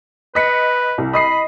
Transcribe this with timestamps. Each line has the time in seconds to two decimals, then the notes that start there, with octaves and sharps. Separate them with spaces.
0.35 B4 D#5 B6 C#7
0.98 C2
1.13 D#5 B5 D#6 C7